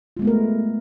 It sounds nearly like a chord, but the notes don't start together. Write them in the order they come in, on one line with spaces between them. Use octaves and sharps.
F4 G#3 B3 A3 A#4